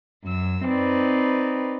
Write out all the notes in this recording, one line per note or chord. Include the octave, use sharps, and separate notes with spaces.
F#2 E6
C4 D#4 B4 D5